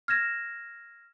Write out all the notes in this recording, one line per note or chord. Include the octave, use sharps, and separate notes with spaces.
F6 G#6 A#6 E7